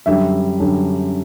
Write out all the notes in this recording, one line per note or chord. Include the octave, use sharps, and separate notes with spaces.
F#2 D3 G3 E5
F#2 D3 G3